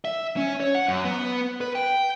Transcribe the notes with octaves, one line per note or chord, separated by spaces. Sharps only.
E5
C#4
C#5
F#5
F#2
B3
B4
G5